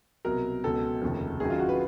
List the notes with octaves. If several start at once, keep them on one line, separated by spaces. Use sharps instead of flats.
C2 B2 F#3 A#4
C#2 B2 F#3 A4
F1 D#2 C#3 F3
F#1 F#2 D#3 F#3 G#4
F4
F#4
B4